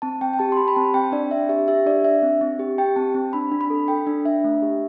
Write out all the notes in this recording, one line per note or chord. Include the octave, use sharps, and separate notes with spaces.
C4 A5
C4 G5
G5
G4 A5
C6
G4 B5
B5
C4 A5
C4 G5
D4 D5
D4 E5
G4 E5
G4 E5
D4 D5
D4 E5
C4
C4
G4
G4 G5
C4 A5
C4
D4 B5
D4
B5
A4
A4 G5
D4
D4 E5
A3
G4